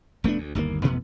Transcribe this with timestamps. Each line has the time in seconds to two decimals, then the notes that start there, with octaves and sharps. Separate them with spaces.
0.24 F1 A3 B3 D4
0.38 D2
0.55 G1 D#2 A#2 A#3
0.84 A1 F2 B2 B3